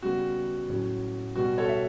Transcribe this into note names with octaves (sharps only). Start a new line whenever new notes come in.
C#3 G3 B3 F#4
A2 F#3 C#4
B2 G3 B3 F#4
A4 C#5
E5